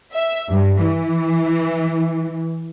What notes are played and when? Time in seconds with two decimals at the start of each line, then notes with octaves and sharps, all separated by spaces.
0.13 E5
0.50 G2
0.83 E3